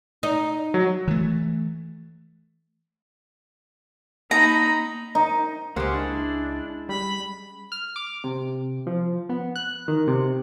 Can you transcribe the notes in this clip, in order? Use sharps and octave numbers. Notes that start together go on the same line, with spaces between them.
D#4
F#3
E3 A3
A#3 D#4 A#5 B5
D#4
C#2 G#3 A#3 C#4 G4 C5 F#5
D4 E4
G3 B5
F6
D6
C3
F3
B3
F#6
D#3
C3